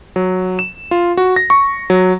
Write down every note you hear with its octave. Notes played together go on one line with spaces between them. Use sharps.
F#3
E7
F4
F#4
A#6
C#6
F#3